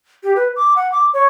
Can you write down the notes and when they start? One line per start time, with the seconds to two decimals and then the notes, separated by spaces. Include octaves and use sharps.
0.23 G4
0.36 B4
0.56 D6
0.76 F#5
0.92 D6
1.13 C#5